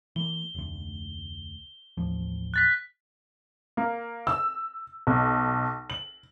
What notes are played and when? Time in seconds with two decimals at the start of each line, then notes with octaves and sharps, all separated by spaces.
0.16 E3 A#3 G7
0.55 F1 D2
1.97 A1 D#2 F3
2.54 F#6 A6 B6
3.77 A#3
4.27 E6
5.07 B1
5.90 F#7